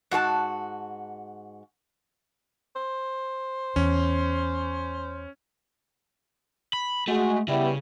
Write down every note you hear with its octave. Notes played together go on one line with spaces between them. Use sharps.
G#2 F#4 A4 A5
C5
E2 C#4
B5
G#3 A3 F#4
C#3 G3 B3 E4